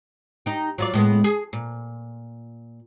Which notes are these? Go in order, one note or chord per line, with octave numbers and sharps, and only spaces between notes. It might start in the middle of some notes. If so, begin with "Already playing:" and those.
D#4 G4
F#3 F4 D5
A2 G#3 B3
G#4
A#2